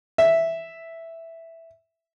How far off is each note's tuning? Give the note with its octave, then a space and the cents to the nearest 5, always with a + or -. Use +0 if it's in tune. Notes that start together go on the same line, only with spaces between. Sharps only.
E5 +0